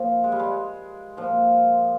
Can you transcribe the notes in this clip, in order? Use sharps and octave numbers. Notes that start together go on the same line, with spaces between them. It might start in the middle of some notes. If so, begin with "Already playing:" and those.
Already playing: A#2 F3
G#3
G3
G#3
A#2 F3